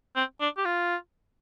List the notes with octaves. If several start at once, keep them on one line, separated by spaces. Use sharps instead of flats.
C4
D4
G4
F4